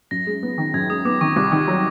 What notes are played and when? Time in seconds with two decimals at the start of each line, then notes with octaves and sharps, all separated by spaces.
0.11 F#2 A#6
0.27 G#3
0.43 B3
0.58 D#3
0.74 F#2 G#6
0.89 G#3 D#6
1.05 B3 D6
1.21 D#3 C#6
1.36 C2 D6
1.52 D#3
1.57 G#6
1.68 F#3